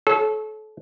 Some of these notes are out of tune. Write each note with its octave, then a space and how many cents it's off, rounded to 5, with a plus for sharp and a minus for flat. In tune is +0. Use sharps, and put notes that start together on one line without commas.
A4 -30 C#5 -15